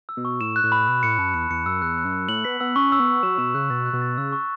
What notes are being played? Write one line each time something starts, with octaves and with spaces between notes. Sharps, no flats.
E6
B2
C#6
A2 E7
F#6
A2
B5
B2 E6
A2 C#7
F#2 A5
E2 C#7
E2 C#7
F#2 E6
E2 F#6
F#6
F#2
F#6
A2 F#7
B3 B6
B3 E6
C#4 C#6
E6
B3
C#6
F#3 E7
B2 E7
C#3 F#6
B2 A6
F#6
B2
A6
C#3 E6
C#6